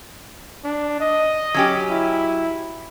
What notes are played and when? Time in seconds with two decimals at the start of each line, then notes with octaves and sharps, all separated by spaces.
0.64 D4
1.01 D#5
1.54 F#3 C#4 G4
1.90 E4